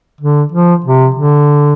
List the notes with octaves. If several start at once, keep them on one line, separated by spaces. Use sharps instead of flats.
D3
F3
C3
D3